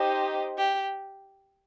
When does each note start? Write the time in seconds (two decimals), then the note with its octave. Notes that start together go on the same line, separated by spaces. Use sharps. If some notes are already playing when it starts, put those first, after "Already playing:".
Already playing: D#4 G4 C5 D#5
0.57 G4